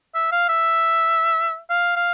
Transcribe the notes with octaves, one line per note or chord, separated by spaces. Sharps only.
E5
F5
E5
F5
F5